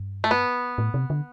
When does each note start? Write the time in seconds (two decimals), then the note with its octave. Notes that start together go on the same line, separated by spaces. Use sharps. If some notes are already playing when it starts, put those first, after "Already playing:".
Already playing: G2
0.24 A3
0.31 B3
0.78 A2
0.94 C3
1.10 D3